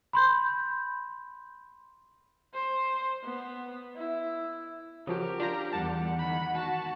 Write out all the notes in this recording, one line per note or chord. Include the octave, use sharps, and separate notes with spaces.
B5 C6 G6
C5
B3
E4
C#3 F3 F#3 G4 A#4
D4 F4 A#5
E2 G3 F#5 A5
D#3 B5
F#4 A5